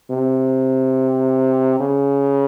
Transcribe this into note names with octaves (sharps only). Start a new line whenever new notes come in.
C3
C#3